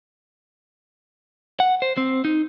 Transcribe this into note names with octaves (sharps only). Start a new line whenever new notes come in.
F#5
C5
C4
D#4